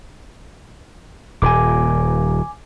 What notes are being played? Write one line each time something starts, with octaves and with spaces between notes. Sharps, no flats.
D#1 A#2 G#5 D6